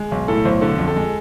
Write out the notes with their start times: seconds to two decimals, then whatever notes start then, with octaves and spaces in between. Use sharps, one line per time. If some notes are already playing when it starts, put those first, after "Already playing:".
Already playing: G#3
0.11 B1
0.28 A2 A4
0.45 B1 C5
0.61 D3 A4
0.78 F2
0.87 A4
0.96 G#3